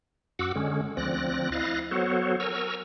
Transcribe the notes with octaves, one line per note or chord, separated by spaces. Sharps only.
F#2 F#4 F#5 D6 E6
D3 G#3 C#4
D2 F3 C4 D5 F#6 A#6
E4 D#5 F5 F#6 A6 A#6
F#3 B3 F#4 A4 C5 C#5
A#4 G#5 A#5 C#6 E6